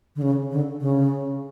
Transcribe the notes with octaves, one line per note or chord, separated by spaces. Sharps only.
D3
C#3
D3
C#3